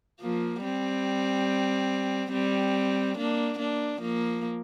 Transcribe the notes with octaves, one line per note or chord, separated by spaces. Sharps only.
F3 A#3
G3 C4
G3 C4
A#3 D4
A#3 D4
F3 A#3